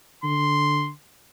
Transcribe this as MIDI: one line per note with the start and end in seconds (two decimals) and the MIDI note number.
0.24 0.90 50
0.24 0.90 84